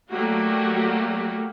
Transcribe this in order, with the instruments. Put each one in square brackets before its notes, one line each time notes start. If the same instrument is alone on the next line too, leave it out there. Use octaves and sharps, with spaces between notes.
[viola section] F#3 G3 A3 A#3 F#4 G4